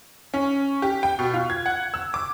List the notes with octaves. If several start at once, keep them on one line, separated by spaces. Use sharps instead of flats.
C#4
G4
G5
B2
F4
G#6
F#5
E6
D6